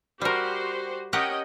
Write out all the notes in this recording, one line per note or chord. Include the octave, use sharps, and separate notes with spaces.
G3 F#4 G4 A#4 C5
C#4 G4 A#4 D#5 F#5 G5